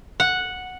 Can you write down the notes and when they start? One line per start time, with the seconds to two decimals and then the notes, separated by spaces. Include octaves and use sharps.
0.20 F#5